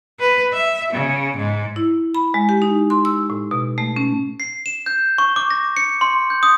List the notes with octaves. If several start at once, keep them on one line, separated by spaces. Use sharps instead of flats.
B4
E5
C#3
G#2
E4
B5
G#3
G4
D#4
C6
E6
A2
B2
A3
C#4
C7
E7
G6
C#6
D6
A#6
C#7
C6
G6
D#6